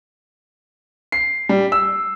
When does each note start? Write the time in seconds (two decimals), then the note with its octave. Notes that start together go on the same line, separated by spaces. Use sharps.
1.12 C7
1.49 G3
1.72 E6